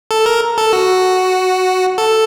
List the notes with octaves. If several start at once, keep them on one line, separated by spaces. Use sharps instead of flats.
A4
A#4
A4
F#4
A4